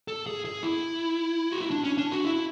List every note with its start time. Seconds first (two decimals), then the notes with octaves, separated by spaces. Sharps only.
0.08 A4
0.27 G#4
0.45 G#4
0.63 E4
1.51 F#4
1.61 E4
1.71 D4
1.84 C#4
1.98 D4
2.11 F#4
2.25 E4